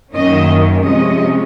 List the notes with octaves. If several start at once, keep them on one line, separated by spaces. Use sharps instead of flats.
F#2 D#3 A#3 C#4 D#5
C3 F3 G#3 C#4 D#5